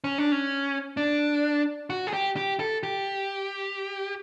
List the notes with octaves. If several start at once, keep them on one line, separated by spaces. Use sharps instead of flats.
C#4
D4
C#4
D4
F#4
G#4
G4
G4
A4
G4